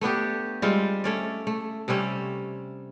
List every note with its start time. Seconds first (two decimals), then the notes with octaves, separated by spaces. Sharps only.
0.01 A3 B3 D4 G4
0.62 G3 G#3 C4 F4
1.04 A3 C#4 D5
1.47 A3
1.88 C3 G3 C4 C#4